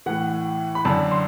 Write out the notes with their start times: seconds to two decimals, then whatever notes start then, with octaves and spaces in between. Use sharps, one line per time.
0.06 A2 E3 F#5
0.75 B5
0.85 F#2 D3 A5
1.11 C6